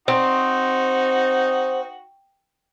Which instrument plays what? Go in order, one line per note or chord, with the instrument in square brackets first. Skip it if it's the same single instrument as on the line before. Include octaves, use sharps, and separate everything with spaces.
[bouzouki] C4 [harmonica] D#4 F#4